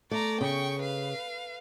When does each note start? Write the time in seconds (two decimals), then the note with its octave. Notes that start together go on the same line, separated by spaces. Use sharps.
0.11 A3 D5 A#5
0.41 C#3 G5 C#6
0.80 B4 F5